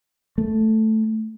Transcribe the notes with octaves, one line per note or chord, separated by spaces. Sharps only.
A3